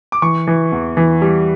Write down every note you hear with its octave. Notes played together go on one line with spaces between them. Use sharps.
D6
E3 C#6
E3
E2
E3
G3